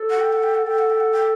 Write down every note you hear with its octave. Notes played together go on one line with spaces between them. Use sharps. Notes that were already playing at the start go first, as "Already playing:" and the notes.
Already playing: A4
F#5
G5
F#5
G5
F#5
A4 G5
F#5
G5
F#5
G5